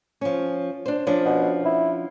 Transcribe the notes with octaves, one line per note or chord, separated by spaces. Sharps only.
F3 C#4
D4 C5
F3 C#4 D4
B2
E4